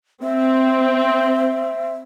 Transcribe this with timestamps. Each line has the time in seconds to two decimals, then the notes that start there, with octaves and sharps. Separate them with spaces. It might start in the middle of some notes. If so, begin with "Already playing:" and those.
0.23 C4 E5